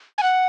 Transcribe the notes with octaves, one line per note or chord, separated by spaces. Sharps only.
G#5
F#5